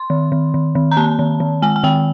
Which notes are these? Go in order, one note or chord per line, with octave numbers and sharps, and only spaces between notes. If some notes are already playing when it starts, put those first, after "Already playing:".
Already playing: C6
D#3
D#3
D#3
D#3
A#5
A#3 A5
D#3
D#3
G#3 G#5
G#5
D#3 G5